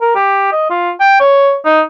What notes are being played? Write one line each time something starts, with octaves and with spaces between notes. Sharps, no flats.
A#4
G4
D#5
F4
G5
C#5
D#4